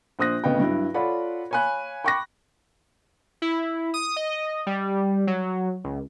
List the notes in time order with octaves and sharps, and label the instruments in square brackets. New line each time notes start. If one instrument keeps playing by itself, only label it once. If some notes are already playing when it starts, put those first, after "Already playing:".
[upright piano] A#1 C5 D#6 F#6 A#6
G#1 D2 C#3 B3 D#5 G5
G2 F#3 E4
F4 A4 C#5 D5 F#5 B5
C#5 F5 G#5 B5 F#6
G5 B5 C#6 D6 F#6 A#6
[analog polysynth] E4
D#6
D#5
G3
F#3
C#2